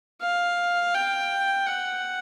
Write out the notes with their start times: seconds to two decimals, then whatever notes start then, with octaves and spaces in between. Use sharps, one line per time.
0.22 F5
0.95 G5
1.66 F#5